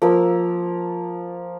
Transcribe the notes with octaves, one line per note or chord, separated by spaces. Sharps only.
F3 A#3 A#4 E6